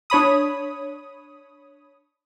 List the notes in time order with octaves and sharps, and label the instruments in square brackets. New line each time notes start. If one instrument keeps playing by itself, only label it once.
[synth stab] D4 C#5 B5 D#6